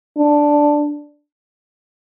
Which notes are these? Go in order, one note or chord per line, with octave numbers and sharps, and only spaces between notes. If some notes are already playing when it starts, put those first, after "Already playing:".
D4